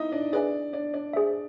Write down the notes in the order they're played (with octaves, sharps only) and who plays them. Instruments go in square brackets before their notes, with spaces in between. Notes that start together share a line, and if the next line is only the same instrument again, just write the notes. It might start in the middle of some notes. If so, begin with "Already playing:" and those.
Already playing: [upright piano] D#4 E4 D#5
D4 D5
[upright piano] D4 D5 [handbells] G#4 B4 E5 G#5
[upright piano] D4 D5
D4 D5
[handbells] G#4 C5 E5